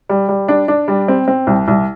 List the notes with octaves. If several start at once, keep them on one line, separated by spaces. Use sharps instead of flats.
G3
G3
D4
D4
G3
C4
C4
C2
C2